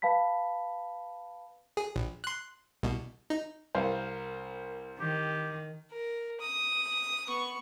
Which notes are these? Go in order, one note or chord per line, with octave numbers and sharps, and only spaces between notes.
B4 F5 A5 B5 B6
G#4
A#1
C6 F#6
C2 B2
D#4
C2 A#4 C5 F5
D#3 G4
A#4
D#6
B3 C#6